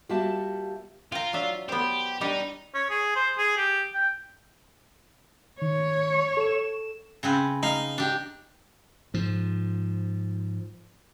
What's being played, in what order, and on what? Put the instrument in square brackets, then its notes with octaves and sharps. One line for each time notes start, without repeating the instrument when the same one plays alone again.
[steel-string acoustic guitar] G3 A#3 F4 F#4 E5 A5
[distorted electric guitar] F4 [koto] G5 A#5
[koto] F#3 D4 E5
[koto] B3 C5 [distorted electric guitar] G4
[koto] G3 D4 G4 [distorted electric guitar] D#4
[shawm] C#5
G#4
C5
G#4
G4
G5
[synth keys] D#3 [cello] C#5
[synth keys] A4 E7
[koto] C#3 C4 B4
[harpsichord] D#4 [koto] F5
[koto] D4 G4
[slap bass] G#2 F3